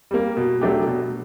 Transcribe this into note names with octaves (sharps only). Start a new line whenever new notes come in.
G3 A#3
B2
F#3 A3 D4 G4
B2